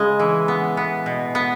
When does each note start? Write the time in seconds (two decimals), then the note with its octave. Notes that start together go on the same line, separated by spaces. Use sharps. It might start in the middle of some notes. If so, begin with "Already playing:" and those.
Already playing: C#3 G#3
0.20 E3
0.48 B3
0.77 B3
1.06 B2
1.35 B3